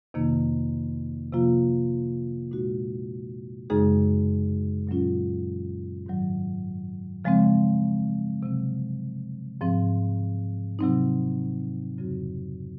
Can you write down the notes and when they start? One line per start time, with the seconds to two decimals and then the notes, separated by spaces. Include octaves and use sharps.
0.14 F2 C3 D#3 A#3 D#4
1.33 C3 F3 A#3 F4
2.51 A#2 G#3 D#4 F#4
3.70 F#2 C#3 G#3 D#4 G#4
4.87 A#2 F#3 C#4 F4
6.06 G#2 D#3 F#3
7.25 C#3 F3 G#3 C4
8.43 C3 F#3 C4
9.61 G#2 F3 C4
10.79 C3 F#3 C4 D#4
11.98 F2 C#3 F#3 C4 F#4